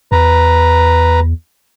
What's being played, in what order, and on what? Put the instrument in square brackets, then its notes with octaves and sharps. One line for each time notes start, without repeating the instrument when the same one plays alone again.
[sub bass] E2 [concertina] B4 A#5